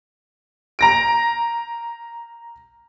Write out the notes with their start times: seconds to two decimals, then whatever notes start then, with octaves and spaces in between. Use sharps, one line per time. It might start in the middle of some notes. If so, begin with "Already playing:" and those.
0.79 A#5 A#6 D7